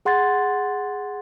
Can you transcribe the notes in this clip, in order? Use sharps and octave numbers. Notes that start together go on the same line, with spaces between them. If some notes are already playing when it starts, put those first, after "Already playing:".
G#4 F#5 C6 G#6 A6